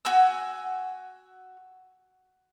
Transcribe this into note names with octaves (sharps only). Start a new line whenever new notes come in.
F#4 G#5 E6